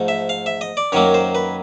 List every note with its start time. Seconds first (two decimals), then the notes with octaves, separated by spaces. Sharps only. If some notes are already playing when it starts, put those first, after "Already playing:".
Already playing: G#2 F3 A3
0.08 E5
0.29 F5
0.46 E5
0.61 D#5
0.77 D5
0.92 F#2 D#3 F#3 A#3 C#5
1.14 C5
1.35 B4